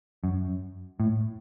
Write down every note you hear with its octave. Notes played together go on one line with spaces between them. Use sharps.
F#2
A2